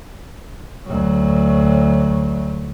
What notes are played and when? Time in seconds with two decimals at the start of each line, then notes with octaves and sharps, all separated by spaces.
0.86 D2 F#3